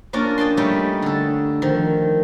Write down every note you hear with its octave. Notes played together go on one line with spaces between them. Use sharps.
A#3 C#4 D4 F4 A#4
D#5 G5 A5 C6
G3 A3 C#4 D#4 G4
D3 A4
D#3 F3